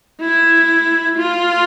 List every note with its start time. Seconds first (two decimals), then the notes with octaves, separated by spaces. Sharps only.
0.21 E4
1.18 F4